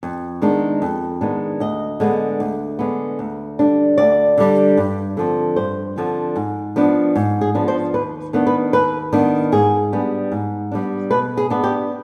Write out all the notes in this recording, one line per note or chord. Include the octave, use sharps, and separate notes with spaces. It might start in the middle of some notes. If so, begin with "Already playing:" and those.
F2
D#3 G#3 B3 D4
F2
D#3 G#3 B3 D4
D2 D#5
D3 G#3 B3
D2
D3 G#3 B3
D2
D3 G3 D4
D2 D5
D3 G3 D4
G2
D3 F3 C4
G2 C5
D3 F3 C4
G#2
F3 B3 D4
G#2
G#4
F3 B3 D4
C5
D#2 B4
D#3 B3 D4
B4
D#2 B4
D#3 B3 D4
G#2 G#4
G3 B3 D4
G#2
G3 B3 D4
B2 B4
G#4
B3 D4
G4